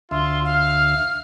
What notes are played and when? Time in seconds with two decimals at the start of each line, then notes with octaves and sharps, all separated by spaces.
0.11 D2 F4 E5 C6
0.46 F5 F6